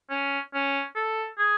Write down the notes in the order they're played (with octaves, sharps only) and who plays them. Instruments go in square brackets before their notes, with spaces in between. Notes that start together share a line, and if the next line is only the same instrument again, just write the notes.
[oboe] C#4
C#4
A4
G#4